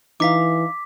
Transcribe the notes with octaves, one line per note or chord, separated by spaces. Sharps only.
E3 D#4 F5 D6 B6